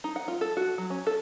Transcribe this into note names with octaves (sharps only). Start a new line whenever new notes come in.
D#4
F#5
F4
A4
F#4
F#3
C#4
A4